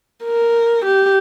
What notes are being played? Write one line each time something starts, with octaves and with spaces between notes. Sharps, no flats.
A#4
G4